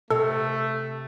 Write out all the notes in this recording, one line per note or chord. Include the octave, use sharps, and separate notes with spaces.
C3 A3 A4